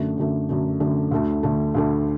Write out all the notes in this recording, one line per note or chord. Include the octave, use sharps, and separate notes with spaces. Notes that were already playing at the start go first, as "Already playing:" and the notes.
Already playing: F#2 D3 A3
F#2 D3 A3
F#2 D3 A3
F#2 D3 A3
D2 D3 A3
D2 D3 A3
D2 D3 A3